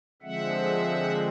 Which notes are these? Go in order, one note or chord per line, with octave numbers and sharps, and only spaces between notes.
D3 F3 G#3 C4 E5 F#5